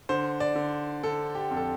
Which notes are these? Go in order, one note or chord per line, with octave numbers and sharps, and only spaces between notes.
D3 C5
D5
D3
D3 A4
G4
F2
A4